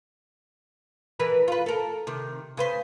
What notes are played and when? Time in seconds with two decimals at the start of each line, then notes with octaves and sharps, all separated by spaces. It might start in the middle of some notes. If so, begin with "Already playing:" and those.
1.19 E3 A#4 B4
1.48 F4 B4
1.66 A4 A#4
2.07 C3 D#3
2.57 C#3 B4 C5